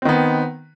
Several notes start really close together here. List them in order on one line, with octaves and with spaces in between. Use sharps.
C4 D#3 B3